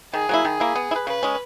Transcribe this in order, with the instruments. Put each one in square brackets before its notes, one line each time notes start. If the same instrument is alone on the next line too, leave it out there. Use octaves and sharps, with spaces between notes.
[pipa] D#3 [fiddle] G#4
[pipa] F#3 A#3 E4
D#3
A#3 E4
B3
E4
B4
[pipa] C#3 [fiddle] B4
[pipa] G#3 C#4